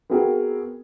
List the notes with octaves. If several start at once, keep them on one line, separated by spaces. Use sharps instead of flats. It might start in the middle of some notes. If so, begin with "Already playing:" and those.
B3 C4 F#4 G#4 A#4